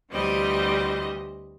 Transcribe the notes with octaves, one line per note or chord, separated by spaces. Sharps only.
D2 E3 G3 C4 D#5